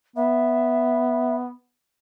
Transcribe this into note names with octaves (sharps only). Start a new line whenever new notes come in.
B3 E5